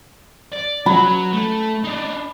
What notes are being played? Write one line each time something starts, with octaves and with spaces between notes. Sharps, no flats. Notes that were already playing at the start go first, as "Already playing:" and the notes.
D5
F#3 B5
A3
D4 D#4